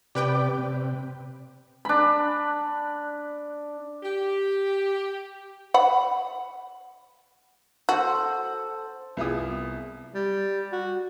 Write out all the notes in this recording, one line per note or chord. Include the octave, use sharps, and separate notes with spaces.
C3 G4 B4 D5 G5
C3
D4 B5
G4
F#5 B5
F#4 A4 C5
C2 B3 E4 F4 G#4 D#6
G3
F#4